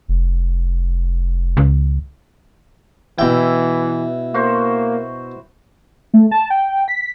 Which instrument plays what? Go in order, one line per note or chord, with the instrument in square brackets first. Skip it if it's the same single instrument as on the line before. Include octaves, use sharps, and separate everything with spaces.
[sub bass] F1
[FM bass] C#2
[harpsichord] B2 G5 [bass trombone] E3 [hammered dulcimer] E4
[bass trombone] A#3 [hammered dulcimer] F#4 C5 C#6
[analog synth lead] A3
A5
G5
B6